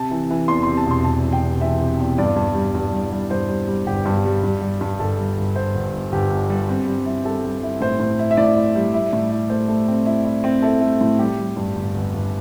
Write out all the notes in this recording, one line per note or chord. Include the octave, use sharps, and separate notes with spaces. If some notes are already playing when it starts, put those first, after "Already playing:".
Already playing: C3 A5
E3
E3
E2 C6
C3 C6
A5
E1 C6
C3 A5
E2
G5
C3
E3 E5
C3
E2
G2 D5
G2
G3
G2
G3
G3
G2 C5
G3
G3
G1 G4
G2
G3
G2
G3
G2
G1 A4
G3
G1
G1 C5
G1
G1
G1 G4
G1
G3
C4
G3
E4
G3 A4
G3
E4
A2 C5
A2
E4
E5
A2 D5
E4
G3
E4
A2
E4
A3 C5
A3
C4
E4
E4
C4
E4 A4
A3
A2
G3 G4
G3
G2
G1
G1
G1